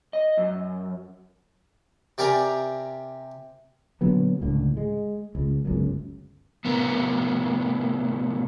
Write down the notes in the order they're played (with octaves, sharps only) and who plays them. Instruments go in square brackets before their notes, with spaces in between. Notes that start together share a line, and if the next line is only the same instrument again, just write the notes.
[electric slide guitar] D#5
F#2
[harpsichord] C3 G4 A#4 D5 G#5 A#5
[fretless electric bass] A#2 D3 F#3 B3
C#2 A2 D3
G#3
C#2
G1 C#2 F#2
[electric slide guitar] A2 C3 B3 A#4